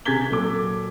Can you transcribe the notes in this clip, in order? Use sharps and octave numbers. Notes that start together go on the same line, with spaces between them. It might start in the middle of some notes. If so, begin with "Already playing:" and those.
C3 G#4 G#6 A6 B6 G7
A#2 F#3 A4 D6